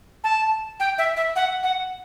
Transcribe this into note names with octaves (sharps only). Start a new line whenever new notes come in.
A5
G5
E5
E5
F#5
F#5